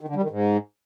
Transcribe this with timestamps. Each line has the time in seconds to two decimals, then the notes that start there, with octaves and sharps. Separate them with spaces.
0.01 D#3
0.08 D3
0.16 G3
0.23 D#3
0.30 G#2